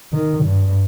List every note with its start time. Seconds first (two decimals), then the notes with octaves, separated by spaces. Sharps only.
0.13 D#3
0.44 G2